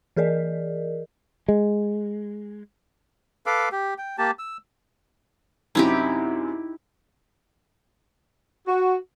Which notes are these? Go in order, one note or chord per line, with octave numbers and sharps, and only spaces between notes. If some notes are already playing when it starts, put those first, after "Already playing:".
E3 G#4 A#4 D5 D#5
G#3
A4 B4 F5 D6
G4
G5
A#3 G4 A5
E6
F#2 C3 D#4 E4 G4
F#4